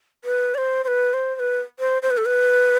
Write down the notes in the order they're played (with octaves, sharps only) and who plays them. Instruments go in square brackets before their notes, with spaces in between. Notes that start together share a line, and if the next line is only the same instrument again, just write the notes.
[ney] B4
D5
C5
C5
B4
C5
C5
B4
C5
C5
B4
A4
B4